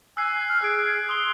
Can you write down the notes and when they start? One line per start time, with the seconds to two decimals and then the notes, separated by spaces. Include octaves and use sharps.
0.17 G#5 E6 F#6 C7
0.49 F6
0.62 G#4 F#6 D7
1.09 C6 D#6 G7